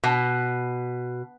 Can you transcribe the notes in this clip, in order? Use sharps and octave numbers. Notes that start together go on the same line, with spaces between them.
B2